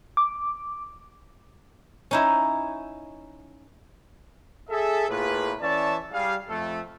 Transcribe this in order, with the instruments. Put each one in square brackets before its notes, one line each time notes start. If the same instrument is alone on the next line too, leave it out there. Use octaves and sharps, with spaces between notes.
[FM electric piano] D6
[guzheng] C#4 D#4 E4
[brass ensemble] G#4 A4 E5
A2 A#3 F4 G#4 B4
E3 C#4 C#5 D5 E5 A5
G3 G#4 F5
F2 A3 A4